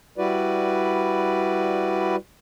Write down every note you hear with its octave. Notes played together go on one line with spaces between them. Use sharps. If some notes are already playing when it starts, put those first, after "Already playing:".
G3 E4 F#4 B4 D5